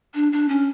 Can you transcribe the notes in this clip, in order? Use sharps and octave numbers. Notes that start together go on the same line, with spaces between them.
D4
D4
C#4